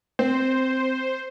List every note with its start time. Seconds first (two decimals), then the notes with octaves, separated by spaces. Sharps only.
0.19 C4 C5